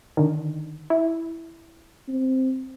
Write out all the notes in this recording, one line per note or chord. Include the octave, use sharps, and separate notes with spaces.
D3 D#3
E4
C4